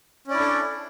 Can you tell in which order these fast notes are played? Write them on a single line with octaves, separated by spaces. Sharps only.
C#4 D5 E4 D4 A4